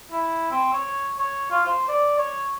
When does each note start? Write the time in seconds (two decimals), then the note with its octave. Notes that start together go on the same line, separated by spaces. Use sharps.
0.12 E4
0.51 C4
0.73 C#5
1.18 C#5
1.51 F4
1.66 C5
1.88 D5
2.18 C#5